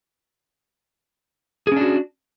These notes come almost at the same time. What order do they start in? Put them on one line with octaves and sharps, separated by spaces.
G#4 C#4 D4 F#4